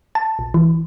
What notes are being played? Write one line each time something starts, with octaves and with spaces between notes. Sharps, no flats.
A5
A#1
E3